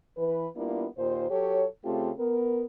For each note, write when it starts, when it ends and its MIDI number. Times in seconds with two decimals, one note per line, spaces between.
0.17 0.48 52
0.17 0.48 71
0.56 0.86 55
0.56 0.86 58
0.56 0.86 59
0.56 0.86 62
0.56 0.86 64
0.56 0.86 65
0.98 1.29 39
0.98 1.29 46
0.98 1.29 65
0.98 1.29 72
1.30 1.66 54
1.30 1.66 67
1.30 1.66 69
1.30 1.66 73
1.85 2.11 49
1.85 2.11 57
1.85 2.11 60
1.85 2.11 65
1.85 2.11 67
1.85 2.11 69
2.19 2.65 59
2.19 2.65 70